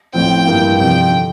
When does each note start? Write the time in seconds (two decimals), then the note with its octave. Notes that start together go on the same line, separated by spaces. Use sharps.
0.13 A1 A2 F3 C4 G5
0.46 G2 E3 A#3 F4
0.78 F2 C3 F3 G5
1.10 D3